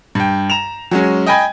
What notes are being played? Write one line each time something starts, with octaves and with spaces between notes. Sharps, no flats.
G2 G5
A#5 E7 F7
F#3 G#3 C#4
D#5 G5 G#5 B5 G#6